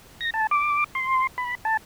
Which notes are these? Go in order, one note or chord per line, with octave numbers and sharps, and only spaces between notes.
A#6
A5
D6
C6
B5
A5